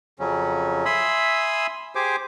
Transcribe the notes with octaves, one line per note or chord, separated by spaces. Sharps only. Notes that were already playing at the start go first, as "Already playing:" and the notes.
F2 C#3 F#3 C#4
E5 G#5 B5 C6 D#6 E6
G4 G#4 C5 G#5 D6